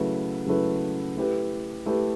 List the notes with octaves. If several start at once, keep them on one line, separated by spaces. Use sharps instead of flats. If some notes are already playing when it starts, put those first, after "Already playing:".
Already playing: C#3 F#3 A3 E4 B4
C#3 F#3 A3 E4 B4
A3 E4 G4 B4
A3 E4 G4 B4